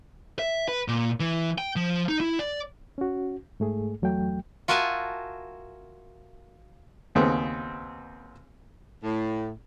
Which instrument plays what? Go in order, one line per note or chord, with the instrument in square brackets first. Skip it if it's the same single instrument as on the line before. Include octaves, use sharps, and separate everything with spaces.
[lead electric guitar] E5
B4
A#2
E3
G5
F3
D#4
E4
D5
[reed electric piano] C#4 F#4
G#2 A3 G#4
E2 F#3 A3 G5
[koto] F4 F#4 A#4 E5 G#5 A5
[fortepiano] D#2 C#3 B3 C4
[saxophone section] A2